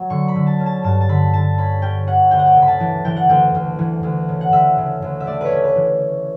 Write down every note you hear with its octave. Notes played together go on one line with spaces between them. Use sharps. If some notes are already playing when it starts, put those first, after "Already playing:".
Already playing: F#3
D3 C#6
B5
D3
A5
C#4
A5
G2 A5
A5
D3 B5
D3 A5
C#4 B5
C#4 G5
C#4 F#5
D2 G5
F#5
G5
C#3
B5
A5
E3
E3 G5
F#5
D2 G5
D2
E3
D2
C#3
F#5
D2 E5
C#3
D2
E5
A3 D5
B4 C#5
C#4
B4
E3